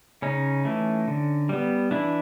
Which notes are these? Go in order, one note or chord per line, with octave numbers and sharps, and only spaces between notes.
C#3 C#4 D#4
E3 A3
D3
G3 B3
E3 D4 E4